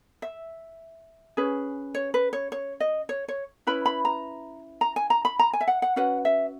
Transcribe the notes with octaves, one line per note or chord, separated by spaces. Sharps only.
E5
C#4 G#4 B4
C#5
B4
C#5
C#5
D#5
C#5
C#5
C#4 E4 B4 B5
B5
A#5
A#5
G#5
A#5
B5
A#5
G#5
E5
F#5
F#5
C#4 F#4 B4 F#5
E5